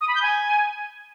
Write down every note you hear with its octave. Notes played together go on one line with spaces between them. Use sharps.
D#6
B5
G6
G#5